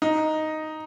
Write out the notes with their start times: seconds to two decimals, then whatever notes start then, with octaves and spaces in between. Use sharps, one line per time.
0.02 D#4